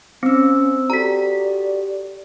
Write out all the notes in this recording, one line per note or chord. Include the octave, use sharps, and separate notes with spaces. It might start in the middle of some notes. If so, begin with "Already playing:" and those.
C4 C#4 C5 E6
F#4 G4 A4 D5 A#5 B6